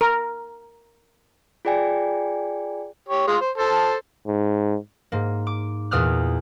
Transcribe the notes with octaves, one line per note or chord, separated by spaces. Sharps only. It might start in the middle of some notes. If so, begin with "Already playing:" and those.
A#4
F4 G#4 D5 G5 G#5
G4 C#5
G#3 F4
C5
A4 C5 A5
G#2
G#2 A#3
D6
E2 A#2 D#6 F6 F#6